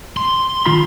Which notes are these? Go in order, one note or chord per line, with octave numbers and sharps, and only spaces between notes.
C6
D#3 F4 B5